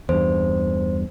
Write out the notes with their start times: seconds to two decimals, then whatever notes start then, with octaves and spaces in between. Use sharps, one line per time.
0.09 E2 G2 C5